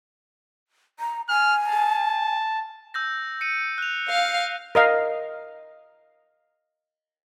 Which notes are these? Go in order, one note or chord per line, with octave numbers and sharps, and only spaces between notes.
A#5
G#5 F6
A5
E6 G6 A#6
C#7 D#7
F#6 F7
F5
A#4 D#5 F5